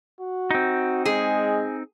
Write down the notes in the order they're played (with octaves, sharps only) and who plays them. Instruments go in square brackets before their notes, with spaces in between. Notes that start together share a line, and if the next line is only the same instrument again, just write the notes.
[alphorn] F#4
[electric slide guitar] C4 D#4
[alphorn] G#3 [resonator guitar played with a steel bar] G#4